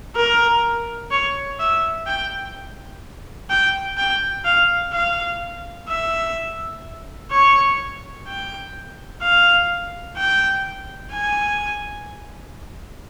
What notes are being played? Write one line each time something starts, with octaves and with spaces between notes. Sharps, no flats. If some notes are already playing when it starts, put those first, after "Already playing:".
A#4
C#5
E5
G5
G5
G5
F5
F5
E5
C#5
G5
F5
G5
G#5